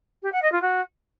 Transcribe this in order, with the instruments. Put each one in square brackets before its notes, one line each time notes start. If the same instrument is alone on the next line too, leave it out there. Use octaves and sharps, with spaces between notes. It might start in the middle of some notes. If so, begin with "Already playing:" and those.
[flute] G4
F#5
D#5
F4
F#4